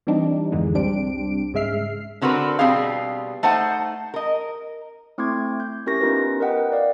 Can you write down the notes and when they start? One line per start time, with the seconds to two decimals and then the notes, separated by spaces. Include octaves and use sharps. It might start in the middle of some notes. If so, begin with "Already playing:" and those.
0.07 E3 G3 C4 D4 D#4
0.52 F2 G#2 D3 E3 G#3 D#4
0.75 C2 G3 C4 D4 D7
1.54 G#2 C#3 G#3 E5 F6 C7
2.22 D3 C4 F#4 A#4 B4
2.59 B2 G3 C4 G4 G#4 F5
3.43 A3 D#4 C5 F#5 A5
4.14 A#4 D#5
5.18 A3 C4 E4 C6 D6 G#6
5.60 G6
5.86 C#4 E4 G4 A#4 C#6 A#6
6.01 B3 C#4 D#4 F4 G4 B4
6.40 A#4 B4 D#5 F#5 G5
6.72 D5 F5